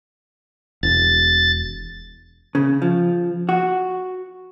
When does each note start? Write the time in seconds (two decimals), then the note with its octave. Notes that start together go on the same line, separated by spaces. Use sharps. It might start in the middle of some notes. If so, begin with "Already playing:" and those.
0.83 E1 A6
2.55 C#3
2.82 F3
3.49 F#4